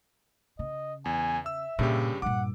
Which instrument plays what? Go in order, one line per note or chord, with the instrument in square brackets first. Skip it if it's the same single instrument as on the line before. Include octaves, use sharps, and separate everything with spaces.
[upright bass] C#3 [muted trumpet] D#5
[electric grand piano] E2 [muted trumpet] G#5
[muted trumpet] E5 [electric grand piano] E6
[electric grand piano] G2 C#3 G4 [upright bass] A#2
[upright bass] G2 A#2 [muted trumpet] F#5 [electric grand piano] D6